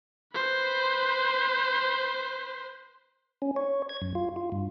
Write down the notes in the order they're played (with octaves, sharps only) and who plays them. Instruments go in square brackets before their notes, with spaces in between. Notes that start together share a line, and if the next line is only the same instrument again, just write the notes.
[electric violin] B4 C5
[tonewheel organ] C#4
C#5
G#6
F#2
F4
F4
G2